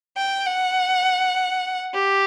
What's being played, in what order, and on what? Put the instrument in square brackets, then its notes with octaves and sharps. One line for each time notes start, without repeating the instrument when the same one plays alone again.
[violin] G5
F#5
G4